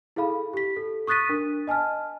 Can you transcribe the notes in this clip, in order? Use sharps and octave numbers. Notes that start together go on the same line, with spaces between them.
E4 G#4 A4 F5 B5
G4 B6
A4
C#6 D#6 F#6 A6 B6 D#7
D4 A#4
D#5 G#5 A5 F6